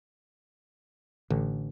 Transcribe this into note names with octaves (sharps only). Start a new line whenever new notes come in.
A1 D3